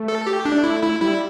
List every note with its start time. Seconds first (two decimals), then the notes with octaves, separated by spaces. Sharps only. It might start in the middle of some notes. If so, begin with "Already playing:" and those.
Already playing: A3
0.08 A4
0.27 G4
0.45 D4
0.64 E4
0.83 E4
1.01 G3 E4